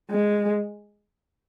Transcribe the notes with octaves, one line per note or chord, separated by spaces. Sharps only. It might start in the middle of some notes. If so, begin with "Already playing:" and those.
G#3